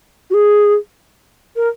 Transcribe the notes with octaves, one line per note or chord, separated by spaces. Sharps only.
F#4
G#4
A#4